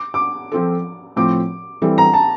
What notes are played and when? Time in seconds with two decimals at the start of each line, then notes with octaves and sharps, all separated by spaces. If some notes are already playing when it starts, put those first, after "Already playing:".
Already playing: D6
0.14 D6
0.52 F3 C4 F4 A4
1.16 A2 F3 C4 D6
1.82 E3 G3 C4 E4 A4
1.98 A#5
2.14 A5